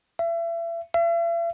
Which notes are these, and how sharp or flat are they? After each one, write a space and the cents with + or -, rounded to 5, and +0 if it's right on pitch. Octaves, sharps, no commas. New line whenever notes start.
E5 +35
E5 +45